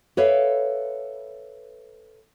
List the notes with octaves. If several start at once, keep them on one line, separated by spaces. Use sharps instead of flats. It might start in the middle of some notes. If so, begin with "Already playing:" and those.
A4 B4 C#5 D5 E5 F5